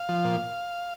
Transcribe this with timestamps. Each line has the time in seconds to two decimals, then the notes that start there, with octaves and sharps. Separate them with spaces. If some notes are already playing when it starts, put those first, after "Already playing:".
Already playing: F5
0.09 F3
0.25 A#2